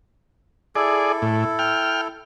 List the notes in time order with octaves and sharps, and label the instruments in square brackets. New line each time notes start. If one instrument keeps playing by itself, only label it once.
[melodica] E4 A4 [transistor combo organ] G#4 D5
[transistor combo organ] A2
G5 F6